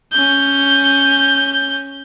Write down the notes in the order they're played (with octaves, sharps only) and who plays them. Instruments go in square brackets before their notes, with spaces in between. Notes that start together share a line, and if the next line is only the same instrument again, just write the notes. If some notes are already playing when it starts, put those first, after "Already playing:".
[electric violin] C#4 G6